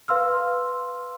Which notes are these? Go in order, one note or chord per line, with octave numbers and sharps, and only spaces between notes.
B4 F5 C6 E6 F6